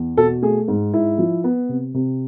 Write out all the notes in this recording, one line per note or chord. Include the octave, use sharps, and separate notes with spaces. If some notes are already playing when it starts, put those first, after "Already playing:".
Already playing: E2
B2 A4
A3 G#4
G#2
G#2 E4
F3
B3
C3
C3